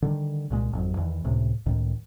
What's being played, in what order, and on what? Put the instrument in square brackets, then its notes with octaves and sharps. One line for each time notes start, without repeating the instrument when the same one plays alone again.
[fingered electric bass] D3 D#3 G3
C2 A#2 G#3
G#1 F2 F#3
E2 D#3 E3
C#2 A2 C3
C#2 A2 D#3